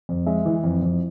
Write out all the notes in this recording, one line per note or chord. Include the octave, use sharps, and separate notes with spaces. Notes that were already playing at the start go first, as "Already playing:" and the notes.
F2
G#3 E5
E3
F2
F2